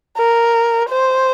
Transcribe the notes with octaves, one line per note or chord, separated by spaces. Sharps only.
A#4
C5